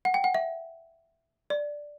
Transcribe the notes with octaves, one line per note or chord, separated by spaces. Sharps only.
F#5
G5
F#5
E5
D5